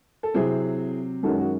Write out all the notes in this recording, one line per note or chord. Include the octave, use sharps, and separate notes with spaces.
A4
C3 F#3 C4 E4 G#4
F#2 D#3 G#3 C#4 F#4 A4
F#4